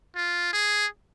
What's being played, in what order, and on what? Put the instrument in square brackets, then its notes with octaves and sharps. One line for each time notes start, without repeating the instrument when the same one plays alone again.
[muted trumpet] F4
G#4